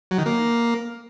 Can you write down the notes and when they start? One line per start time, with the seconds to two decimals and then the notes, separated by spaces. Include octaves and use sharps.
0.11 F#3
0.19 D#3
0.26 A#3